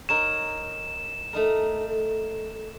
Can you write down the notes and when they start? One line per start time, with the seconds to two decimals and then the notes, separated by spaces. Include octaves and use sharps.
0.09 D#4 A#4 C#5 E7
1.33 A3 D#4 A#4